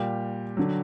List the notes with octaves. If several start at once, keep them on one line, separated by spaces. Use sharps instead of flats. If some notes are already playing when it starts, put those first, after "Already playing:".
Already playing: A#2 G3 G4
D3 F#3